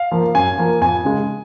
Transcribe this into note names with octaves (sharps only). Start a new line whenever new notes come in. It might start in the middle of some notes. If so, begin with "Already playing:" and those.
Already playing: F5
F3 A#3
F#2 G#5
F3 A#3
F2 G#5
C#3 G#3